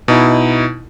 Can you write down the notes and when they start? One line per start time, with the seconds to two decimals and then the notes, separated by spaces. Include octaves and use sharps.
0.08 B2 D#4 E4